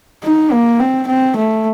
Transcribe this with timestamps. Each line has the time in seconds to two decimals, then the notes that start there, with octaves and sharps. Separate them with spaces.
0.24 D#4
0.51 A#3
0.79 C4
1.07 C4
1.36 A3